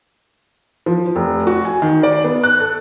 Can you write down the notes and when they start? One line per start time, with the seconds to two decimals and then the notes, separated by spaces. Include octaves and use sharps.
0.86 F3
1.16 F1
1.47 F#4
1.65 G#5
1.82 D#3
2.03 D5
2.24 B3
2.43 F#6
2.60 A4